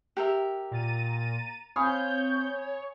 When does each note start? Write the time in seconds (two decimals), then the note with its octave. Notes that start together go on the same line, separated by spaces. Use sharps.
0.17 G4 A#4 E5
0.71 A#2 A#5 A6 D#7
1.76 C4 C#5 F5 G#5 B5 D#6 G6